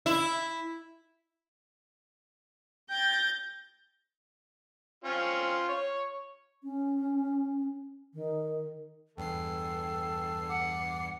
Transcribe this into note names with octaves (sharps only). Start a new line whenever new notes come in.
E4
G5 G6 A6 A#6
C4 C#4 F4
C#5
C#4
D#3
E2 G2 A4 G5 C7
F#5 D6